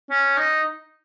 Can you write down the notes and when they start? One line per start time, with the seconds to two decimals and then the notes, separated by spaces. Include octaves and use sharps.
0.10 C#4
0.37 D#4